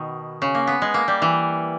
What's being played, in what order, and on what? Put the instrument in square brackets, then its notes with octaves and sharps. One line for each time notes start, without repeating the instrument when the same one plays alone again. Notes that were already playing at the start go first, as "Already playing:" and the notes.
Already playing: [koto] B2 D#3
C#3
A#3
B3
G#3
A#3
G3
E3